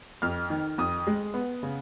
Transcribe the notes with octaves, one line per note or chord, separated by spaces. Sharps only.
F2 F6
D#3
F2 D#6
G#3
B3
C#3